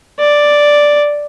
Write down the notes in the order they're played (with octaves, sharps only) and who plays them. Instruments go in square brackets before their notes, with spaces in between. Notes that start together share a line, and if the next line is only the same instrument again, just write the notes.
[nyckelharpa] D5